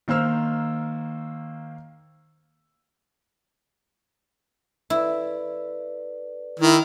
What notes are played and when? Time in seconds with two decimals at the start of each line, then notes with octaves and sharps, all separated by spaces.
0.08 D#3 A#3 C5 E6 F6
4.90 E4 A4 B4 D5
6.60 D#3 E4